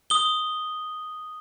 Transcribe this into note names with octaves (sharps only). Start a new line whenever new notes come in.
D#6 G7